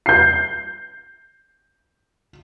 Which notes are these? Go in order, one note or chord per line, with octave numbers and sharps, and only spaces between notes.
G6 C7